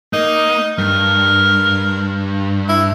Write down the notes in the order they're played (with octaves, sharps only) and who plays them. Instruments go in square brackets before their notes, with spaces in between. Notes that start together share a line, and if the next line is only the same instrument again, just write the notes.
[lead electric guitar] A#3 [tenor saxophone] D#4
[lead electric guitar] G2 [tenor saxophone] A#4
[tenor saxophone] E4